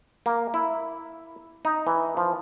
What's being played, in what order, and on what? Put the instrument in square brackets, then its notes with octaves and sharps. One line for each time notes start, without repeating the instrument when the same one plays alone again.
[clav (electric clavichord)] A#3
E4
D#4
E3
F3